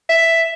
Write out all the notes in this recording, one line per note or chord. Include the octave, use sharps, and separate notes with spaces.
E5